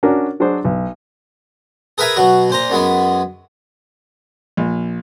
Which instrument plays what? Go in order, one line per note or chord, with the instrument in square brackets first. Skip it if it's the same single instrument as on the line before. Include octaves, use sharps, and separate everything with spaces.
[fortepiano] C#4 D4 F#4 A#4
F#3 D4 F#4 G#4 C5
B1
[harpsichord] G#4 A#4 B4 E5 G#5 A#5
B2 F#3 F#4
A#2 C5 A#5
F#2 F#3 G#3 B3
[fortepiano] A#1